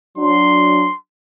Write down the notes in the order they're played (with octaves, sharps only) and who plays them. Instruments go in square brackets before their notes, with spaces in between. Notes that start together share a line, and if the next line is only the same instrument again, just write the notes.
[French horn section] F#3 D4 [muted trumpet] C6